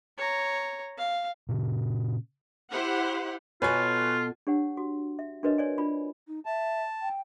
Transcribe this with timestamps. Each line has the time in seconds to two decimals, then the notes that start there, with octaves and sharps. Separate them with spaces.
0.18 C#5 A#5
0.97 F5
1.49 A#2 C#3
2.71 E4 G4 C5 F#5
3.62 B2 F4 A4 B4 C#5 G#5
4.47 D4 G4 C#5 F#5
4.77 F#4
5.19 E5
5.43 D4 F#4 A#4 B4 C#5 D#5
5.58 C#5 D5 G#5
5.78 D4 F4 B5
6.28 D#4
6.46 E5 A5
7.02 G5